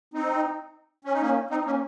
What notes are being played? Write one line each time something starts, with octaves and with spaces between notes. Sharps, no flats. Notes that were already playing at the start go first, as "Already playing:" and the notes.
C4 D#4
C#4
D#4
A#3 C#4
C4 D#4
A#3 C#4